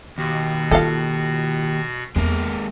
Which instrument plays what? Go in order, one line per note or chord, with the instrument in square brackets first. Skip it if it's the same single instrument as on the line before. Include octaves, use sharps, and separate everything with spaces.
[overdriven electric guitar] D#2 [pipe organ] B2 F#4
[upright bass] F4 [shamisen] A4 F5
[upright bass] E2 [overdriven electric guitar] G#3 A#3